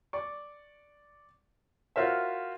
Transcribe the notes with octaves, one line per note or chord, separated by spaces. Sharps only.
D5 C#6
F4 F#4 A#4 C5 C#5 E5